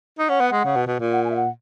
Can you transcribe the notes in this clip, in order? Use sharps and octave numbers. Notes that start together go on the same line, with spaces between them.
D#4
C#4 F#5
B3
G#3
C#3
B2
B2
A#2
F#5
G#5
E5
F#5